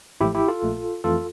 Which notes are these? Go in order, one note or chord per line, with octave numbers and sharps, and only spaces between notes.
A1 A2 F3 A3 E4 G4
E4 G4
F4 A4
A#1 A#2 A3
F2 E3 A3 F4 A4